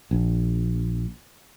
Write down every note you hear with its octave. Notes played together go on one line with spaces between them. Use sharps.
A#1